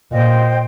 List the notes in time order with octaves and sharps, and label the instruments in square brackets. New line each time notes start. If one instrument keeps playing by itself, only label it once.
[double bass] A#2 [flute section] C5 D#5 G5